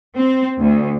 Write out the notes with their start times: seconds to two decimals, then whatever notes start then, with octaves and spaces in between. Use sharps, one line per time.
0.16 C4
0.59 D2